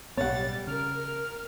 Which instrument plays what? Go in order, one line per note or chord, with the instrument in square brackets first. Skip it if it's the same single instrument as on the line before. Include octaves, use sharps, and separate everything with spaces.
[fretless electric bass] B1 A2 B3 [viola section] G3 [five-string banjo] C#5 F#5 [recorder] A6
[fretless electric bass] C#3 [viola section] A#4 [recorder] F6